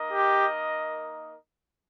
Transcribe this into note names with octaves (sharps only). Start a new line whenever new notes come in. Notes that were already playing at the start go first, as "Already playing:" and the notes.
Already playing: A#3 D#4 A#4 D#5
G4